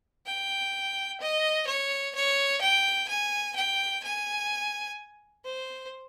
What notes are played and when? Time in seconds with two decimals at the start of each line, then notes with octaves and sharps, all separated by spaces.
0.27 G5
1.21 D#5
1.68 C#5
2.16 C#5
2.62 G5
3.09 G#5
3.56 G5
4.04 G#5
5.45 C5